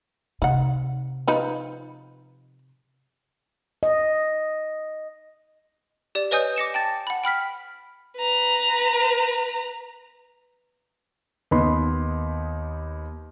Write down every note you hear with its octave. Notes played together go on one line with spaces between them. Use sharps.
C3 D#4 F#5
F3 D#4 B4
D#5
G4 D5
B4 C#5 D#5 G#5 D#6 G6
D6 A#6 C#7 E7
G5 A5 A6
F#5 B5
G5 B5 F6 B6
B4 A#5
D#2 B3 D#4 B5 C6